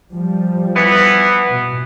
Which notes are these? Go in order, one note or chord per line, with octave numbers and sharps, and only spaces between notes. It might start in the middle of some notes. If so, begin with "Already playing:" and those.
F3 G3
E3 B3
B2